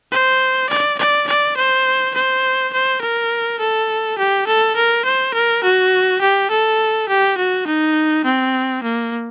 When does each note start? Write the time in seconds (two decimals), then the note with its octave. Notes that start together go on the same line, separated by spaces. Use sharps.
0.12 C5
0.69 D5
0.99 D5
1.27 D5
1.57 C5
2.14 C5
2.73 C5
3.01 A#4
3.60 A4
4.18 G4
4.47 A4
4.76 A#4
5.05 C5
5.34 A#4
5.64 F#4
6.21 G4
6.51 A4
7.09 G4
7.38 F#4
7.67 D#4
8.25 C4
8.83 A#3